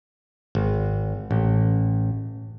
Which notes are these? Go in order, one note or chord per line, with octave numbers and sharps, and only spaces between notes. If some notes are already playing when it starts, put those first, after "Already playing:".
G#1
A1